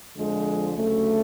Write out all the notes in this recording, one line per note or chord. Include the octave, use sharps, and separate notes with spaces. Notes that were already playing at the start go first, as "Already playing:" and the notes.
F2 D3 F3 G#3
D2 C#3 F#3 A3